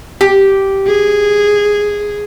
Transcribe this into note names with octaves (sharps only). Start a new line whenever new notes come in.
G4
G#4